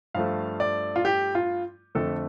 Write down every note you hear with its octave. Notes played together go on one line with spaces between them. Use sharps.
G2 F3 A3 F5
D5
F4
G4
F4
F2 D3 F3 A3 A4